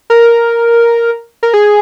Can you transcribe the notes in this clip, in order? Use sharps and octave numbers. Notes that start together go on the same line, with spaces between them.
A#4
A#4
G#4